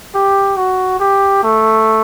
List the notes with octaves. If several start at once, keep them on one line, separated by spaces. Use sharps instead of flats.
G4
F#4
G4
A3